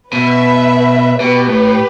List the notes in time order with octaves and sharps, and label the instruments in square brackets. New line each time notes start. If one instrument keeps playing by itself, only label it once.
[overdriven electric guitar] B2 [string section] B4 E5
[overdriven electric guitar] B2 [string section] G4 B4
[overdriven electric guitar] A2